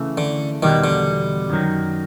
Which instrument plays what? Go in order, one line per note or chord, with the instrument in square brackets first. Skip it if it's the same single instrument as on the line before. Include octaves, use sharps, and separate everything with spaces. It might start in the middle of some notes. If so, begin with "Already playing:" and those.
Already playing: [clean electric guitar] C#3 E3 A3
[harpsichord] D3
[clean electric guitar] E2 B2 G3 [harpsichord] D#3
[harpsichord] D3
[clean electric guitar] F#2 D#3 F#3